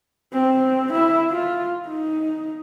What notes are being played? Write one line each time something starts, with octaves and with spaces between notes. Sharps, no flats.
C4
E4 E5
F4
D#4